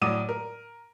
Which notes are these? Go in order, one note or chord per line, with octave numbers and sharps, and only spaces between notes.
A2 F#3 D5 D6 D#6 D#7
A#4